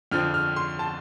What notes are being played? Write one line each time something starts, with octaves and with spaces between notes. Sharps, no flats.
F2 D3 F3 C4 F6
F6
C6
A5